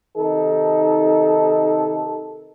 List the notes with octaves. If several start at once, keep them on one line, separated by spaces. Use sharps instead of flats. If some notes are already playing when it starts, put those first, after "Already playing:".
C3 D#3 D#4 A4